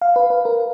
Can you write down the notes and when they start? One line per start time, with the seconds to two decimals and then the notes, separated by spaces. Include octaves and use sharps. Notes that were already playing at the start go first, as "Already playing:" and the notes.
0.02 F5
0.16 B4
0.30 B4
0.45 A#4